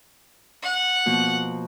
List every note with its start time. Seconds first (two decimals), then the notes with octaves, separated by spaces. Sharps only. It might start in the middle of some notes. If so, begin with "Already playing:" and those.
0.62 F#5
1.06 B2 F3 A#3